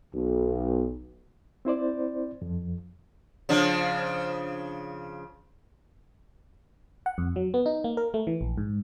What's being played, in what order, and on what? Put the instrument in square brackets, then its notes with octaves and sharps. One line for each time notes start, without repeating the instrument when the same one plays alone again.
[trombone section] B1
[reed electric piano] C4 E4 C5 D5
F2 F3
[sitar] C#3 F3 D4
[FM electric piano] F#5
F2
F#3
B3
D#4
A#3
A#4
A3
E3
A#1
G#2